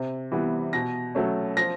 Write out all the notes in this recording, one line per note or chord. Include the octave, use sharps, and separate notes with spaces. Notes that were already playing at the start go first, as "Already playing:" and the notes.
Already playing: C3
E3 G3 B3
B2 A#6
F#3 A3 C#4
F3 A#6